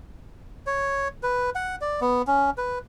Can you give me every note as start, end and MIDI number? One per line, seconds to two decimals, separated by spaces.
0.67 1.08 73
1.23 1.50 71
1.55 1.76 78
1.81 2.00 74
2.01 2.22 59
2.27 2.50 61
2.58 2.79 71